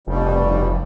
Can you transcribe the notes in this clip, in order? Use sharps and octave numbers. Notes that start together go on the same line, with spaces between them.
F1 G2 B2 G3